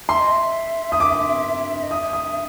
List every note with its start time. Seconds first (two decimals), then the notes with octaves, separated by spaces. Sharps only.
0.08 E5 C6
0.20 D#5
0.32 E5
0.92 D#6
1.00 D6
1.83 D#5
1.91 E5 D#6
2.13 D#6